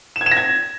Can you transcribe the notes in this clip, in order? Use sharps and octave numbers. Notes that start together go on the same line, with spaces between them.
E7
G#6
E7
A#6
G#6